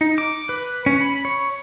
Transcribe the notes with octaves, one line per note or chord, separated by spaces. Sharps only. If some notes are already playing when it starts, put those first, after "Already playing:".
D#4
D6
B4
C#4
B5
C#5